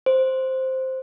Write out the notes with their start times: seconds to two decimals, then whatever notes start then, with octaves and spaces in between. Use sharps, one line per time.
0.06 C5